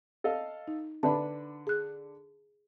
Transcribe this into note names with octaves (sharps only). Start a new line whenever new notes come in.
A4 D#5 F5
D#4
D3 D4 B4 E5 A5 B5
G#4 F#6